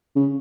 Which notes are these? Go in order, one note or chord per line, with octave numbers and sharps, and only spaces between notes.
C#3